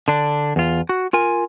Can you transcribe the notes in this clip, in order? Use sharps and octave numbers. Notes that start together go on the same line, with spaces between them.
D3 D4
E2 F4
F#4
F4 A#4 G#5